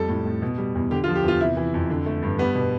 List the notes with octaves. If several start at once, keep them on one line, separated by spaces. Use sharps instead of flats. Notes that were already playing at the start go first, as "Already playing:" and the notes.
Already playing: F2 G3 A4
A2
A2
B2
G3
E2
D3 G4
F4
F3
G4
E2 F4
C3 E4
E3
F2
D3
A3
G2
G3 B3
B2